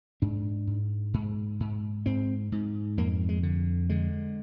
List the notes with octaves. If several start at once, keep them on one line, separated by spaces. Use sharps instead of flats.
G#2 D4
G#2
G#2
G#2
G#2 C4
G#2
F2 A#3
G#3
D3
D3 G#3